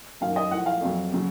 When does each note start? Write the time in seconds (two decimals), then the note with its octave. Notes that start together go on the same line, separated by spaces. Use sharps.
0.21 F#2 D#3 F#3 F5
0.36 D#5
0.51 A2 F#5
0.56 F3
0.66 F5
0.81 F2 C3 F#3
1.12 C#3 F#3